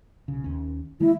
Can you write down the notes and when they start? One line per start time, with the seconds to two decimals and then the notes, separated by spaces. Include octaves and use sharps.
0.28 B1 C#3
0.44 D#2 C#4
1.00 D#3 G#3 A#3 E4